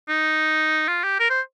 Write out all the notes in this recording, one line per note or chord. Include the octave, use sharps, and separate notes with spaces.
D#4
F4
G4
A#4
C5